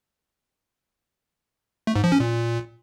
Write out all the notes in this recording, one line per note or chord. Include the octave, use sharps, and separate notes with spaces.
A3
G#2
F3
C#4
A#2